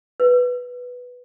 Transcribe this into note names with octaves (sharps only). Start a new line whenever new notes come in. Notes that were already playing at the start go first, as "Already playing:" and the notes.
B4